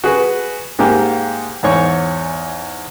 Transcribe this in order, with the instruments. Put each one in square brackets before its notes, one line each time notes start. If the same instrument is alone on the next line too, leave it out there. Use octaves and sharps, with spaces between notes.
[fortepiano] F#4 G#4 B4
G#2 G#3 A#3 G4 F5
E2 G#2 C#5 C#6